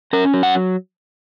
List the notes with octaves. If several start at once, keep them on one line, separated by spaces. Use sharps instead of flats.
C#4 A#4
F#3
F#5